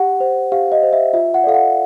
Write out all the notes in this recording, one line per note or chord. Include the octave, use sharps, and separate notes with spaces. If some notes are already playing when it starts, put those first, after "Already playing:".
Already playing: G4 F#5
C5
G4 F5
D#5
C5
E5
F4 E5
F#5
A4 D5 F5
F#5